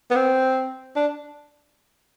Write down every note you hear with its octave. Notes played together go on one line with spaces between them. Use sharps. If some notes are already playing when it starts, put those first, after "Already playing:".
B3
C4
D4